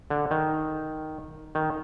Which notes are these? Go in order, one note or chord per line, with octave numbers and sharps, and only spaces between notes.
D3
D#3
D#3